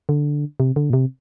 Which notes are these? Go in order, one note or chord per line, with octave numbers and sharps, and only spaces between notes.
D3
C3
D3
A#2
C3